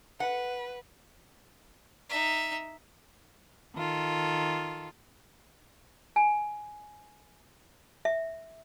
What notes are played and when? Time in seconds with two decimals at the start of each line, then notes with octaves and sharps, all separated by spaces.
0.20 B4 F#5
2.10 D#4 E5
3.76 D#3 F4 A4
6.16 G#5
8.05 E5